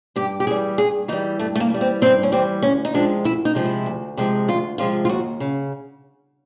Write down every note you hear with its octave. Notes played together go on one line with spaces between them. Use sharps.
G2 G4
G4
E3 G3 G#4
G2 G#4
E3 G3 D#4
G2 A3
A3
A#3
E3 G3
C4
G2 C4
C#4
E3 G3 C4
D2 C#4
D#4
C3 F3 G#3 D4
D2 E4
D#4
C3 F3 G#3
E4
D2
C3 F3 G#3
D2 F4
C3 F3 G#3 F4
F4
D#2 F#4
C#3